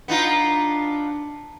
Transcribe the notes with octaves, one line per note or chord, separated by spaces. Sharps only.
B3 D4 D#4 F4